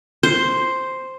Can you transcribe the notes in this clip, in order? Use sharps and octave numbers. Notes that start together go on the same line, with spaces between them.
C5